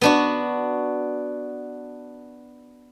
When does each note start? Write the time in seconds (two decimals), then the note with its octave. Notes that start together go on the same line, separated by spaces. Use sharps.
0.01 B3 D4 F#4